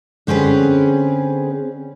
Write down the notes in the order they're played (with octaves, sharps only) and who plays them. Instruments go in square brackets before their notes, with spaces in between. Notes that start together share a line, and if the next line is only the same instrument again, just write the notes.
[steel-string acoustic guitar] D3 C4 C#4 G#4 B4